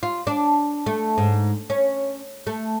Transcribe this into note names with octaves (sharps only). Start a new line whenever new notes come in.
F4
D4
A3
G#2
C#4
A3